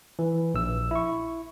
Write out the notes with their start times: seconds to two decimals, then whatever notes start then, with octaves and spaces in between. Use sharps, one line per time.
0.19 E3
0.54 A#1 E6
0.91 E4 C#6